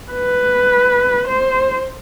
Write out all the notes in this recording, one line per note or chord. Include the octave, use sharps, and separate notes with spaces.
B4
C5